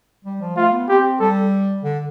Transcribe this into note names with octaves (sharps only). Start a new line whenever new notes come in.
G3
F3
A3 F4
B3
C4 G4
G3 A4
D3